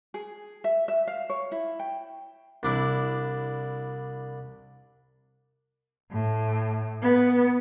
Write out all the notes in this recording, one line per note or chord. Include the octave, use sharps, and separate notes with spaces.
G#4
E5
E5
F5
C#5
E4
G5
C2 D4 E4
A2
B3